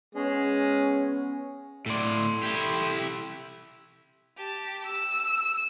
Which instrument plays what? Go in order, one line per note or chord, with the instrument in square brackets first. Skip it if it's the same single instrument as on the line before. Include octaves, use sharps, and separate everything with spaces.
[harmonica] G#3 G#4 [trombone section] B3 C#4
[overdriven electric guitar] A2 D5 [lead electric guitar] A4 C6
[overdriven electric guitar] E4 G4
[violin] G4 A5
E6